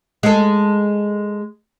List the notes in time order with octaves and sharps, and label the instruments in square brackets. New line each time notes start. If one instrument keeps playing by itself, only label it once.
[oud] G#3 A4